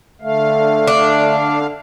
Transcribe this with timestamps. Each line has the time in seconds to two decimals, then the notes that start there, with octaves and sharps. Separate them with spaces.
0.22 D3 A3 F5
0.87 D4